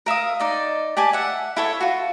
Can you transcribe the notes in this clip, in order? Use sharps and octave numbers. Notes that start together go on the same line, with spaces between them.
A#4 E5 F5 D#6
D#4 D5 D#5
G4 D5 G#5 A5
E5 F#5
E4 A4 C#5
F4 F#4